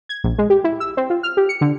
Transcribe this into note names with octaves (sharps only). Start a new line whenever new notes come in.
G#6
A#1
G#3
G4
E4
E6
C4
F4
F6
G4
C#7
D3